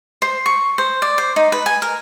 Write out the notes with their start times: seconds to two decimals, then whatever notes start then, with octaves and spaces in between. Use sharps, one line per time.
0.22 C5
0.46 C#6
0.78 C5
1.02 D5
1.18 C5
1.36 D#4
1.52 B4
1.66 G#5
1.82 A#4